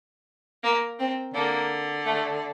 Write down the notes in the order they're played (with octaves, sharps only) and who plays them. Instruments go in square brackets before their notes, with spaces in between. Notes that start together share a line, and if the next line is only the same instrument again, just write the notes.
[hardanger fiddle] A#3
C4
[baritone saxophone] D3 [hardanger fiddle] A#3
[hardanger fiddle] A3